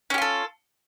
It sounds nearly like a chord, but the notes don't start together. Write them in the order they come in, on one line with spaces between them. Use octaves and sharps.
C#4 G4 F4 A4